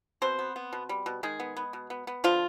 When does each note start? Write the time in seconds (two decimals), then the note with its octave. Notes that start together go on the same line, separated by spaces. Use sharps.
0.22 B2 C4 C5
0.39 B3
0.56 B3
0.73 B2
0.89 G3
1.06 B2
1.23 D#3 G#3 G#4
1.40 B3
1.57 B3
1.73 B2
1.90 B3
2.07 B3
2.24 D3 F3 F4